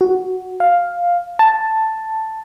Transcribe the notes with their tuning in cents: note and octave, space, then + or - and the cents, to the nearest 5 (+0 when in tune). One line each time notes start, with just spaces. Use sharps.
F#4 +5
F5 +5
A5 +5